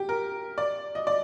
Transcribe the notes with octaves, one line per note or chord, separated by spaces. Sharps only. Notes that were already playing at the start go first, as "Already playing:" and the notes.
Already playing: G4
A#4
D5
D#5
D5